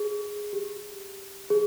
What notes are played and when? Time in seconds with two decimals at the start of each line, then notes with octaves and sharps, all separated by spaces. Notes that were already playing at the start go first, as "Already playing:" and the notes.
Already playing: G#4
0.53 G4
1.50 G#4